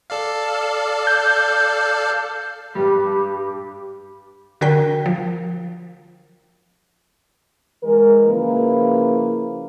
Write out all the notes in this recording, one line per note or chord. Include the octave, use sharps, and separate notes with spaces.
A4 D5 F5
G6
G2 G3 G4
D3 F#4 A#4 G5 B6
F3
E3 G#3 A#4
C#3 F3 A#3 E4 B4